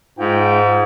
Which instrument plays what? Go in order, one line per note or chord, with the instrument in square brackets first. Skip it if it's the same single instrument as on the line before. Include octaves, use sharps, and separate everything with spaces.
[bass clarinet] G#2 [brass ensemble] G#3 F4 G5